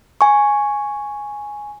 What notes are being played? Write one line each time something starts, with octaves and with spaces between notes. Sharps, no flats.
G#5 C#6